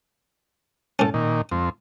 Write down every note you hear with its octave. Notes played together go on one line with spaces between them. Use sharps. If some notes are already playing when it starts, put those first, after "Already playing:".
A2 C#4 A4
A#2 D#3
F2 C4